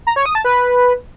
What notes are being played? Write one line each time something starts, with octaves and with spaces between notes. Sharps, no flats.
A#5
C#5
D#6
A5
B4